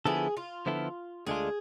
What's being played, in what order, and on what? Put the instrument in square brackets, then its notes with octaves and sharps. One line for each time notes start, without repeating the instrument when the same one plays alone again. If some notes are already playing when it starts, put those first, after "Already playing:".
[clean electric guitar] D3 F3 B3 E4 A4 [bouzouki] G#4
[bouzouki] F4
[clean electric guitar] D3 F3 B3 E4 A4
[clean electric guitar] D2 D3 G#3 D4 F4 [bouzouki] G#4